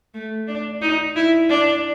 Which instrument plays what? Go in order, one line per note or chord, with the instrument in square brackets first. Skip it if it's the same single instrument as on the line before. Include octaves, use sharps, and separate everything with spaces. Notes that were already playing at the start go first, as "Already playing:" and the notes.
[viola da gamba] A3
D4
D#4
E4
D4